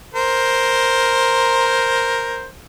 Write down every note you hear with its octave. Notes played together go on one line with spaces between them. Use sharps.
A#4 C5